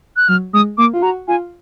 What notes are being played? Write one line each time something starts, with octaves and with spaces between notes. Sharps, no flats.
F#6
F#3 F6
G#3 D#6
A#3 D6
F4
F#4 A#5
F4 G#5